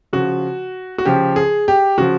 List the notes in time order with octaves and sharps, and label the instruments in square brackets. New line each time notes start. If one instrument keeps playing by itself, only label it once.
[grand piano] C#3 F3 F#4
F#4
C#3 F3 G4
G#4
G4
C#3 F3 F#4